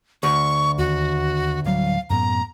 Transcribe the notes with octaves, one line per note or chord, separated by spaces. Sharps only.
D2 C#6
D#2 F#4
D1 F#3 G3 F5
F#2 A2 B3 A#5